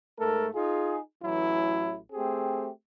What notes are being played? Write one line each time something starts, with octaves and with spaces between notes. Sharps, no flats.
G#2 A3 A4 A#4
D#4 F4 G#4
A1 E3 F#3 E4
A3 C4 G4 G#4